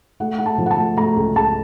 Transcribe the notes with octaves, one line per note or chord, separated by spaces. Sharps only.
A3 F#5
A3 F#5
A5
F3
F#5
A5
A3
A3 A#5
C#2
C#2 A5